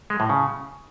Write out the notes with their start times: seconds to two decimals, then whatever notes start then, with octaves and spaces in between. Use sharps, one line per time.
0.10 G#3
0.20 A2
0.29 C#3